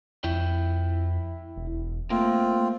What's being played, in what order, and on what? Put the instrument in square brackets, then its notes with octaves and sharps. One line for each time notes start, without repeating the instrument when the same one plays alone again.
[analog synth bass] F2 [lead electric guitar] E4 G5
[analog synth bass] E1
[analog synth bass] A3 [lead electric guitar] A#3 [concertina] C4 F4